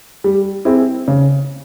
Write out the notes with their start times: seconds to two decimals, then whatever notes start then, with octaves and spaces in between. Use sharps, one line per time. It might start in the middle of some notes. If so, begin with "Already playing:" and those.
0.24 G3
0.65 C4 E4 G#4
1.08 C#3